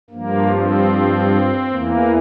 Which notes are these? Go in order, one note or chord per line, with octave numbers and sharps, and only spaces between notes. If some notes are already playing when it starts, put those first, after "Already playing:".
G2 F3 A#3
C4
E2 E3 A#3